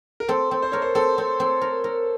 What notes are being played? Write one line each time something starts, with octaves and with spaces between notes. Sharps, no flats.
A#4
C4 A4
C4
C5
A#4 C#5
C5
C4 A4
C4
C4
A#4
A#4